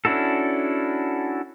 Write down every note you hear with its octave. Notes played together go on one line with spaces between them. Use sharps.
C#4 D4 E4 F#4 A4